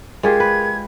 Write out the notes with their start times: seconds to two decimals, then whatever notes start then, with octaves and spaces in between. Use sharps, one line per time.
0.23 G#3 F4 G4 G#4 A#4 G#6
0.40 B4